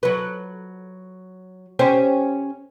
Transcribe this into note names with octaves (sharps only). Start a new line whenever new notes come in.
F#3 B4
C#4 G4 C5